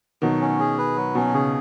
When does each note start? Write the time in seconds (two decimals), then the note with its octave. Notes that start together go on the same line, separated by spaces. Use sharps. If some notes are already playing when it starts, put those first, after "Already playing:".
0.22 B2 D#3 F#3
0.41 C#4
0.60 G#4
0.78 B4
0.97 F#3
1.15 B2 C#4
1.34 C#3 G#4